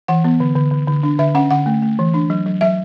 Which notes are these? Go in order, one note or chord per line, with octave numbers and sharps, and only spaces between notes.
E3 F#5
B3
D3
D3
D3
D3
D4
D3 E5
C#4 F#5
D3 F#5
A3
A3
E3
D4
F#3
F#3
F#3 E5